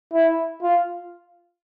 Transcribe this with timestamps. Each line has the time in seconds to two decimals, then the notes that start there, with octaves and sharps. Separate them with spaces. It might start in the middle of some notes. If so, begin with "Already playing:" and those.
0.14 E4
0.63 F4